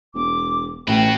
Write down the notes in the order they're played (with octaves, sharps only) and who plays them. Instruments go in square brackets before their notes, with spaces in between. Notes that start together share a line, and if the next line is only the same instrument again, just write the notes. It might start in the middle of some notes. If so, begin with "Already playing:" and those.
[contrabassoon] E1 [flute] D6
[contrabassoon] A1 [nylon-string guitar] A2 [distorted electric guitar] F#4 B4 [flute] G5